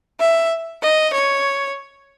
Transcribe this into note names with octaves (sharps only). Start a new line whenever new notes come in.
E5
D#5
C#5